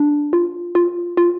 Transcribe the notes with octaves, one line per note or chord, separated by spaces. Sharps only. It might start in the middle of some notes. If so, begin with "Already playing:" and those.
Already playing: D4
F4
F4
F4